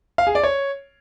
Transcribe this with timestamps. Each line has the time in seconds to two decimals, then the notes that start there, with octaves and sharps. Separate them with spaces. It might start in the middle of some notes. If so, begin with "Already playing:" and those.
0.18 F5
0.27 G#4
0.35 D5
0.43 C#5